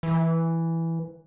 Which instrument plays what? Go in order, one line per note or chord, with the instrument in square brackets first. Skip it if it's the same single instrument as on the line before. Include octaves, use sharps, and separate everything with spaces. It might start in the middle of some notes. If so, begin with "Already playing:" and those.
[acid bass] E3